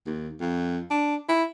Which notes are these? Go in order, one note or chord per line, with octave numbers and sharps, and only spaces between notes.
D#2
F2
D4
E4